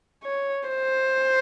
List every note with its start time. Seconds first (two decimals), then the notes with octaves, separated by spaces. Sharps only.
0.24 C#5
0.67 C5